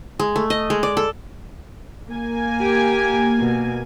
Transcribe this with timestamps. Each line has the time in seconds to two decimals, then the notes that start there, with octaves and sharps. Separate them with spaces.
0.19 G#3
0.36 A3
0.50 D#5
0.70 G#3
0.83 D5
0.97 A4
2.10 A#3 G#5
2.61 G4
3.39 B2